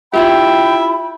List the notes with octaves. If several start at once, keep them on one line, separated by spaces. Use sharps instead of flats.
E4 F4 G4 E5 G5 B5